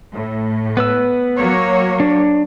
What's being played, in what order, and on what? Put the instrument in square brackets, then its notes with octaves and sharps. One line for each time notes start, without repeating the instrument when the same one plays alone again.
[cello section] A2
[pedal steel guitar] B3 B4 E6
[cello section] F#3 A#3 C#5
[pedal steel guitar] D4